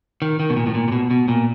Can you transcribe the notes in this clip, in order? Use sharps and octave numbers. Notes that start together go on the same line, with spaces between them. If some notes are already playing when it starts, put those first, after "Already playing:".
D#3
D#3
B2
A#2
A2
A#2
A#2
B2
B2
A#2